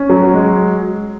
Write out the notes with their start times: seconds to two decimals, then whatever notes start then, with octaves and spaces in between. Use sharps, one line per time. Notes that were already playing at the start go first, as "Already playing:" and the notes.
Already playing: C#4
0.09 F#3
0.34 G#3